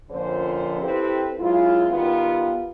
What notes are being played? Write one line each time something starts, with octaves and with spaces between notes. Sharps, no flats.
F2 A#2 D3 C#4 C5
C4 E4 G4 A4 B4
F#2 G#3 E4 F4
D#3 G3 B3 F4